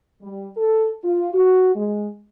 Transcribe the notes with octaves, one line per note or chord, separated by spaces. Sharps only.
G3
A4
F4
F#4
G#3